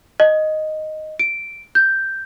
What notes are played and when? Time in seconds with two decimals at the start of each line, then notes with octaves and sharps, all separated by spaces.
0.20 D#5
1.19 D7
1.75 G6